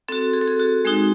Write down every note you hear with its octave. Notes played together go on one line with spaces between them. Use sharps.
C4 F#4 A4
G#4
A4
G#4
F#4
G#3 C4 D#4 F#4 G#4